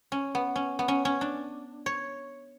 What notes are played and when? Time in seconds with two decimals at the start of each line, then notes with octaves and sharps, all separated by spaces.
0.12 C#4
0.35 B3
0.56 C#4
0.79 B3
0.88 C#4
1.05 C#4
1.21 D4
1.86 C#5